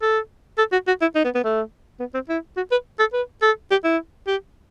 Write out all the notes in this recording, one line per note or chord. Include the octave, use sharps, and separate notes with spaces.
A4
A4
F#4
F#4
E4
D#4
B3
B3
A3
B3
C4
E4
F#4
B4
A4
B4
A4
G4
E4
G4